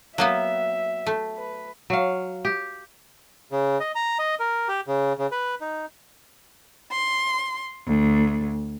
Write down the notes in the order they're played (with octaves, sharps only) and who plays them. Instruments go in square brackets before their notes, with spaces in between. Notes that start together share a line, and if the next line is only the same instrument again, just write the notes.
[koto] F#3 A#3 B3 [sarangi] E5
[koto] A3
[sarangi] B4
[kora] F#3 F5
G4
[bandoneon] C#3
D#5
A#5
D#5
A#4
G4
C#3
C#3
B4
D#4
[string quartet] C6
D2